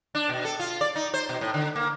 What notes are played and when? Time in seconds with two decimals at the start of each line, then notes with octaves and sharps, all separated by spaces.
0.15 D4
0.29 B2
0.45 A4
0.60 F4
0.81 D5
0.96 D#4
1.14 C5
1.29 B2
1.41 A2
1.54 D3
1.76 A#3